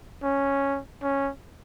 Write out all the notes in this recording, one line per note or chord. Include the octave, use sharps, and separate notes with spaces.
C#4
C#4